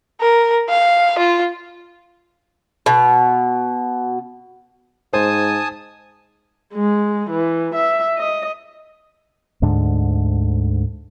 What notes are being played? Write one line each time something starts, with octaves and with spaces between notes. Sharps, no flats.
A#4
F5
F4
B2
G#2 C5 G#5 A5 D#6
G#3
E3
E5
D#5
D2 G#2 D3